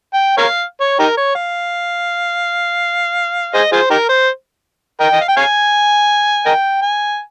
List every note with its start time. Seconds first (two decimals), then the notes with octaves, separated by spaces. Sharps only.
0.13 G5
0.37 A#4 C#5 F5
0.80 C#5
0.99 D#4 G4 A#4
1.17 C#5
1.35 F5
3.54 G#4 C5 D#5
3.72 F4 G#4 C5
3.90 D#4 G4 A#4
4.09 C5
5.00 A#4 D#5 G5
5.12 D#5
5.21 F5
5.28 G5
5.37 C#5 F5 G#5
6.46 A#4 D#5 G5
6.82 G#5